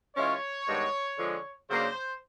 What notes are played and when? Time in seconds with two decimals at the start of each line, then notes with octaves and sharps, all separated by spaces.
0.15 E3 G#3 C#4 F4 C#5
0.67 G2 D#3 G#3 B3
1.18 D3 F3 G#3
1.68 C#3 F#3 A#3 D4 C5